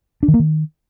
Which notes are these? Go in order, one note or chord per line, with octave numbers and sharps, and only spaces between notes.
D4
D#3
A#3
D#3